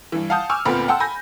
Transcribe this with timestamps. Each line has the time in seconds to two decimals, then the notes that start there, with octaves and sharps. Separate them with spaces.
0.12 G2 E3
0.30 F5 F#5 A5 D#6 G6
0.50 G#5 C#6 D6 E6 F6
0.66 D2 A#2 B3 C4 B5
0.88 F#5 G5 A5 C6 E6
1.00 G#5 B5 G6 A#6